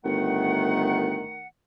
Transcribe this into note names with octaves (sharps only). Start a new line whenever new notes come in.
G1 D#3 A3 F#5